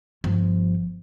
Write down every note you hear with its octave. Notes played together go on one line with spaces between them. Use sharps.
G1 F3